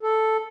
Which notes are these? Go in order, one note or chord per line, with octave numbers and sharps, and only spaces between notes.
A4